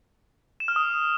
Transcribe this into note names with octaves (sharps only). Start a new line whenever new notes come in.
E7
F6
D#6